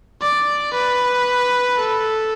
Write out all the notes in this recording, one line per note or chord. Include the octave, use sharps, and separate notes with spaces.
D5
B4
A4